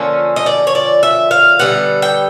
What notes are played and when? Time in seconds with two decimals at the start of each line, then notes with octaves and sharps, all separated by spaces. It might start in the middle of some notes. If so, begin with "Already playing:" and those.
Already playing: D3 F3 A#3 C#4
0.36 D#5
0.46 D5
0.67 C#5
0.75 D5
1.03 E5
1.31 F5
1.59 D3 G3 B3 F#5
2.02 G5